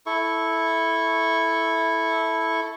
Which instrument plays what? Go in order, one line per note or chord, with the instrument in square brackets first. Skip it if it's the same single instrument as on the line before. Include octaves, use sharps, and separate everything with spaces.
[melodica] E4 A4 C#6